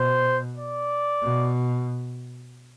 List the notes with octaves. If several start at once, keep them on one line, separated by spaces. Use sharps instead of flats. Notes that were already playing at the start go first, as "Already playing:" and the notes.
Already playing: B2 C5
D5
B2